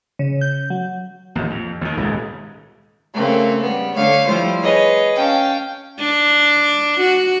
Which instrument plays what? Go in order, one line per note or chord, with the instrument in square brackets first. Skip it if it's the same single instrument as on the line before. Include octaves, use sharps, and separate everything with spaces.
[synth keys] C#3
G6
F#3
[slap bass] A1 D#2
F2
D#2 D#3
D#1 C#2 G#2
[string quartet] C#3 A3 A#3 C4
G3 B3
D3 A3 C#5 F5
F3 G3 A3 E4 F4 C5
G#4 B4 C#5 D#5
C#4 F5 G5 A5
[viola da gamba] D4
F#4